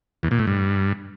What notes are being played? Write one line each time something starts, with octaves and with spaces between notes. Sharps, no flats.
E2
A#2
A2
G2